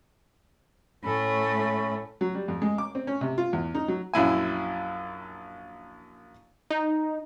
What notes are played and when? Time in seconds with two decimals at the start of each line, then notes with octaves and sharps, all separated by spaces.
1.04 A2 A3 C#4 B5
2.21 F#3
2.35 G3
2.48 F2
2.62 G#3
2.78 D6
2.95 C4
3.07 C#4
3.21 C3
3.38 F4
3.53 E2
3.75 D#4
3.88 F#3
4.14 A#1 F#2 E4 G#5
6.70 D#4